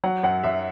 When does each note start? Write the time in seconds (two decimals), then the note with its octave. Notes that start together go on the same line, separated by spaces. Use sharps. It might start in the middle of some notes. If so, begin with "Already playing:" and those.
0.04 F#3 F#5
0.23 F#2 F#5
0.44 F#2 E5